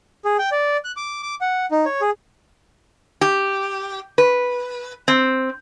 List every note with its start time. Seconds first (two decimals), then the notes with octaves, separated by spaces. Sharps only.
0.25 G#4
0.39 G5
0.52 D5
0.84 F#6
0.96 D6
1.23 D6
1.41 F#5
1.71 D#4
1.86 C#5
2.01 G#4
3.21 G4
4.18 B4
5.08 C4